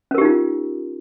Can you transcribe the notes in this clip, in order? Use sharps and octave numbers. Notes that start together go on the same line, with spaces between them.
C#4 D#4 F4 G4 A#4